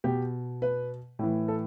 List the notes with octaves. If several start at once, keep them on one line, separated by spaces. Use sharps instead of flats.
B2 G4
B4
A2 E3
A4